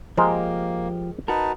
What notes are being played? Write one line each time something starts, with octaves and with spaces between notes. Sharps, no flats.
F3 G#3 A#3 G4 A#4 C5
D#4 F#4 A#4 B4 A5